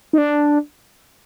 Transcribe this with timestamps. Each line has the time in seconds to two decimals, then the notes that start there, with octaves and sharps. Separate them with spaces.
0.13 D#4
0.18 D4